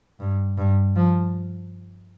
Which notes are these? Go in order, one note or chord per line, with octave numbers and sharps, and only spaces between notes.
G2
G2
F3